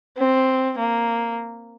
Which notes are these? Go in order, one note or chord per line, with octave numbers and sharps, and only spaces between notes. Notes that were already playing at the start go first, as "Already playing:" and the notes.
C4
A#3